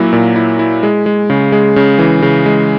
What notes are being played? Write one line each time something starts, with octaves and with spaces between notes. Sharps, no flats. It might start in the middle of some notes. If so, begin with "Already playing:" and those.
Already playing: A#2 F#3 A#3 E4
A#2
E4
E4
G#3
G#3
C#3
G#3
C#3
E3
C#3
G#3